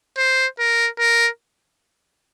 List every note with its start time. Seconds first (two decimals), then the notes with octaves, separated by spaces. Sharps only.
0.18 C5
0.59 A#4
1.00 A#4